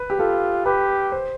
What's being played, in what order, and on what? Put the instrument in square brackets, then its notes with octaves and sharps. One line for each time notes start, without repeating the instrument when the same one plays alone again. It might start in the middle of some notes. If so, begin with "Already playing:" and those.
Already playing: [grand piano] B4
G4
[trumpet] F4 [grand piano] A4
[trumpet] G4 [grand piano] B4
[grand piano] C5